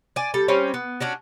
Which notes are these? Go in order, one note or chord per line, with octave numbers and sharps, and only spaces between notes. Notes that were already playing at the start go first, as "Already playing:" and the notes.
D5 G#5
G3 A4
G3 C4 C#4
B3
C#4 D4 F#4